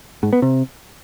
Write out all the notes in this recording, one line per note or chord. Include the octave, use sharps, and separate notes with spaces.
G#2
B3
C3